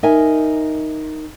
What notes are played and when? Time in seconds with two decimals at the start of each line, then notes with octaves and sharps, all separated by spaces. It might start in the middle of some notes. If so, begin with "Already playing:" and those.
0.03 D#4 A#4 E5 G#5